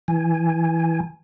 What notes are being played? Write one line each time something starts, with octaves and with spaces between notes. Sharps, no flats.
E3 G#5